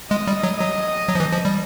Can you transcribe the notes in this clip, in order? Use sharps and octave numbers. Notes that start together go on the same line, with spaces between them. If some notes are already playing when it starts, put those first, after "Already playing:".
G#3 D#5
G3
F#3
F#3 D#5
F#3
F3
E3
F3
G3